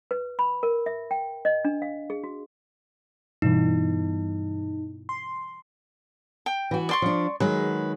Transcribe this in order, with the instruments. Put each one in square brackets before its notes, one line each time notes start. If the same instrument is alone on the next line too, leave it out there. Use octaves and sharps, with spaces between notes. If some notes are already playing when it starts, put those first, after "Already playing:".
[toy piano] B4
B5
A#4
E5
G5
D#5
D4
F5
G#4
F#4
[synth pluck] G2 B2 E3 [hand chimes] D#4
[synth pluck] C6
[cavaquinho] G5
[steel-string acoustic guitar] E3 F#4
[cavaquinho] D5 C6 C#6
[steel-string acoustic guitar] F3 D4
[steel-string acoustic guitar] D#3 F#3 G#3 [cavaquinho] B4